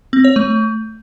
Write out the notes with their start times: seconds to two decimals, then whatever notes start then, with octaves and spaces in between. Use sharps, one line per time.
0.13 C4
0.24 C#5
0.36 A3